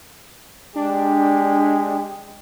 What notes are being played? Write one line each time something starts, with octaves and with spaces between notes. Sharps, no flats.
G#3 D4 G4